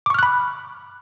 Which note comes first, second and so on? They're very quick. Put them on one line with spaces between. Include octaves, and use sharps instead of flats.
D6 C#6 F6 F#6 B5